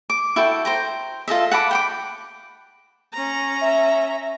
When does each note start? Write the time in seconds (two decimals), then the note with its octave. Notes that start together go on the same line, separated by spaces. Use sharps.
0.10 D6
0.36 E4 F#4 A4 G5
0.65 C5 G5 A#5
1.28 F4 A4 D#5 E5
1.51 F#5 A5 B5 D6
1.71 G5 B5 D6
3.14 C#4 A#5
3.61 E5